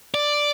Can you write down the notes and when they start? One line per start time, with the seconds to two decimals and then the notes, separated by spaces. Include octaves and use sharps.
0.14 D5